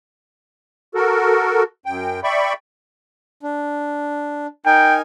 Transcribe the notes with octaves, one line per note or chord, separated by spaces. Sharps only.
F#4 A4 A#4
F#2 G5
D5 E5 G5 B5 C#6
D4
D#4 A#4 G5 G#5